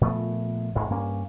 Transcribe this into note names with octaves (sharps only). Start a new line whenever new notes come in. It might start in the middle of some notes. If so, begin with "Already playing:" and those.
A#2 F3 A3 B3
A1 G#2 D3 E3
G2 A#3 C#4